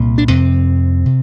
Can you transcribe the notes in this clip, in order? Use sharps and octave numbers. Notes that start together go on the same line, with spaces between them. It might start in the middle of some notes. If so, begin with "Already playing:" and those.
Already playing: C2 A#2 A#3
D4
F2 C3 C4
C3